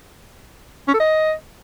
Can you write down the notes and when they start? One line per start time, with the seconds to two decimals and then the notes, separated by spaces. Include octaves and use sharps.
0.88 C#4
0.94 A4
1.00 D#5